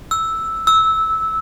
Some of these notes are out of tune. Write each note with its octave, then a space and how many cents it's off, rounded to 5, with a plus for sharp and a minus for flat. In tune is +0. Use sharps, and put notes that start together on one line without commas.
E6 -5
E6 -15